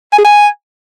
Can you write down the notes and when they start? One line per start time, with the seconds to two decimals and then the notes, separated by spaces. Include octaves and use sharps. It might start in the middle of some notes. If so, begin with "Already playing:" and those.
0.13 G#5
0.19 G#4
0.25 G#5